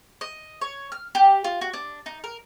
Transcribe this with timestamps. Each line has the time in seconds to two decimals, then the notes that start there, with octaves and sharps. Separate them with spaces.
0.21 D#5
0.61 C#5
0.92 F6
1.15 G4
1.44 F4
1.61 F#4
1.73 D4
2.06 D#4
2.24 A#4